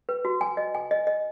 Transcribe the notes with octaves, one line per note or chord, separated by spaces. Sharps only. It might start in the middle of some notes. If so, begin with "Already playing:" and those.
B4
F#4
G#5
D#5
G#5
D#5
D#5